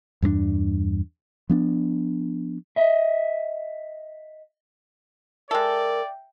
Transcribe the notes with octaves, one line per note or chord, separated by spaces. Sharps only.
E2 G2 A3 D4
F3 B3 D4
D#5 E5
G#3 A4 A#4 D5 E5 G5